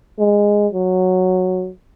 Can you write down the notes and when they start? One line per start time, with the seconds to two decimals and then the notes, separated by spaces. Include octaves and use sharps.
0.19 G#3
0.73 F#3